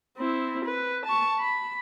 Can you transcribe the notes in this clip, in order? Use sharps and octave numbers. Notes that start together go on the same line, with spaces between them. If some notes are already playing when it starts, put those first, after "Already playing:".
C4 E4
B4
A5 C#6
B5